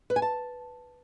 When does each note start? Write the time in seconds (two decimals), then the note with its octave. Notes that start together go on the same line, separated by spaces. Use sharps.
0.10 B4
0.16 G#5
0.22 A5